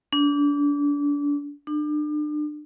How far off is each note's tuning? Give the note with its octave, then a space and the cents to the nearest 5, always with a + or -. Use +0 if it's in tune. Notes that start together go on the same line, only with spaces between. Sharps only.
D4 -30
D4 +35